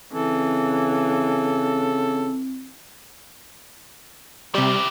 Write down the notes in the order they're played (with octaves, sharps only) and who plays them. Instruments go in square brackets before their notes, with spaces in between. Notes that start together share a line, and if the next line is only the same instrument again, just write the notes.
[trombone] C#3 [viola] E3 [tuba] C4 [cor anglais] A4
[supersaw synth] C3 G3 [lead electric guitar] E4 G4